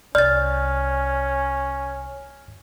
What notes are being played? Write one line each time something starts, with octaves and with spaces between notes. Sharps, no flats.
C2 C#4 D5 F6 A6